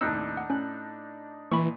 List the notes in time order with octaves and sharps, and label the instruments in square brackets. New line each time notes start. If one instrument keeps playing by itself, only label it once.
[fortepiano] D#2 A2 C3 [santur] D4 D#4 [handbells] E6
[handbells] F#5
[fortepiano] A2 F#6 [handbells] C#4
[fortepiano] A#2 [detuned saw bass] E3 [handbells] B5 C#6